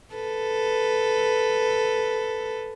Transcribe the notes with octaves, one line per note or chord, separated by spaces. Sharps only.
A4 B4